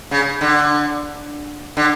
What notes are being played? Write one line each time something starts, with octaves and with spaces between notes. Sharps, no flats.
C#3
D3
D3